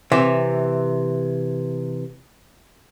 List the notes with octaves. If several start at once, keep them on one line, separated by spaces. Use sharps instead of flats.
C3 E3